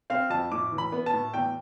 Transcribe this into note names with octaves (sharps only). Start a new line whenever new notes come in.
C4 F5
F2 A5
A2 D6
E3
B5
B3
A5
A2
E2 G5